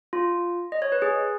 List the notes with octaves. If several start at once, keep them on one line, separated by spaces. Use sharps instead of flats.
F4
D#5
C#5
B4
G#4